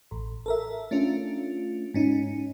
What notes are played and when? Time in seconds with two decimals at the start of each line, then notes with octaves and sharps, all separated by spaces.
0.11 A1
0.46 A4 A#4 E5
0.91 A3 C#4 D4 F4
1.94 G#2 C#4 D#4